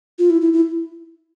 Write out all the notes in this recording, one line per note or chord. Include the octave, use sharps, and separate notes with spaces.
F4
E4
E4
E4